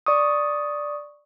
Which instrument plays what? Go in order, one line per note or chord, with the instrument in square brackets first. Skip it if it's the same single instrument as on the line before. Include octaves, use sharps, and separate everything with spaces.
[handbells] D5 C#6 D#6